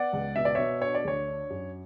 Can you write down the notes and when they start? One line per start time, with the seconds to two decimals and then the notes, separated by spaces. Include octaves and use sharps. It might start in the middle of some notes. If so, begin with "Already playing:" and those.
Already playing: B3 D5 F#5
0.13 C#2
0.36 B2 E5
0.45 D5
0.55 B2 C#5 E5
0.81 D4 C#5
0.95 D5
1.05 D2 C#5
1.28 D4
1.50 F#2